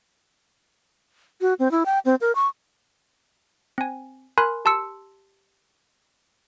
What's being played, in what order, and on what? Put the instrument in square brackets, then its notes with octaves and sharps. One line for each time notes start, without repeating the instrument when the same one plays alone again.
[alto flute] F#4
C4
E4
G5
C4
A#4
C#6
[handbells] C4 G#5
A#4 G#5 B5 C6 F#6
G4 A5 C6 E6 C#7